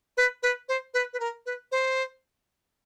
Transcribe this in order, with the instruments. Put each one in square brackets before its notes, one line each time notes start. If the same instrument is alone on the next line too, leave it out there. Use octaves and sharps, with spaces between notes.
[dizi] B4
B4
C5
B4
B4
A#4
B4
C5